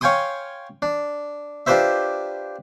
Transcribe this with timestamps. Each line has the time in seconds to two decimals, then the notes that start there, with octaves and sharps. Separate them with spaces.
0.01 C#5 F5 G5 G#5 C6 D#6
0.82 D4
1.67 D4 F4 G4 B4 C5 E5